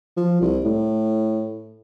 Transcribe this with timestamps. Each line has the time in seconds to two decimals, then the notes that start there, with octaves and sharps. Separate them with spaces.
0.17 F3
0.41 C2
0.64 A2